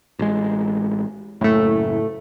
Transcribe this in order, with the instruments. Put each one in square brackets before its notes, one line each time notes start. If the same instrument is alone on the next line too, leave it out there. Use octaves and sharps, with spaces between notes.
[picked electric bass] A1 G#3
[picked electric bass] F#1 [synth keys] A2 A3